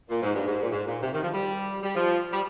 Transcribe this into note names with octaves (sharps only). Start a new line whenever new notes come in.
A#2
G#2
G2
G#2
A#2
G#2
A#2
C3
D#3
F3
G3
G3
F3
G3